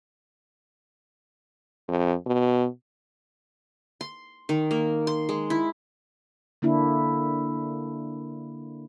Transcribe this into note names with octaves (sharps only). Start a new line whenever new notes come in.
F2
B2
C6
D#3
A#3
C6
G#3
E4
D3 A#3 D4 E4